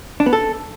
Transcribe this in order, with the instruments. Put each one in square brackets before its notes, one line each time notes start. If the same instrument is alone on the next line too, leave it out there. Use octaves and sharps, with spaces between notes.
[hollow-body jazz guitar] D4
B3
A4